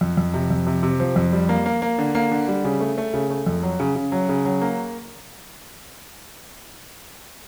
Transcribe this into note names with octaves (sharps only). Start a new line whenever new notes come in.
F2
F2
C3
F2
C3
C3
F3
F2
G3
A#3
A#3
A#3
D3
A#3
D3
G3
C#3
A3
A3
C#3
A3
F2
F#3
C#3
C#3
F#3
C#3
F#3
A#3